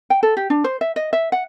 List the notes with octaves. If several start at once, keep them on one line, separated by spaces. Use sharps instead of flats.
G5
A4
G4
D4
C5
E5
D#5
E5
F#5